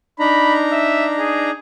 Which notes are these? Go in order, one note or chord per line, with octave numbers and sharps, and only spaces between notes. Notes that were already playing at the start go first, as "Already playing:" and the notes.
D4 D#4 A#5 B5
E5
G#4